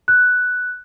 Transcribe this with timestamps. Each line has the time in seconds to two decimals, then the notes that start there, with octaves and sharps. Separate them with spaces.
0.08 F#6